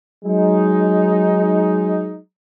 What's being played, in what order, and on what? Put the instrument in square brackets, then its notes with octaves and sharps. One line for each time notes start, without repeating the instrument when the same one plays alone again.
[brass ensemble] F#3 G#3 D#4